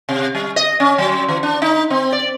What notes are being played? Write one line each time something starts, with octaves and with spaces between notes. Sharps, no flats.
C3
G3
D#5
C#4
F#3
E3
D4
D#4
C4
D5